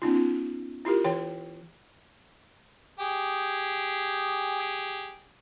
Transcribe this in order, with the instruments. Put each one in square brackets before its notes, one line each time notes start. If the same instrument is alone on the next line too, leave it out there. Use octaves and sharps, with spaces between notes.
[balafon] B3 C#4 D#4 F4
F4
E4 F4 G4 A#4
E3 C#5 G5
[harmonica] G4 G#4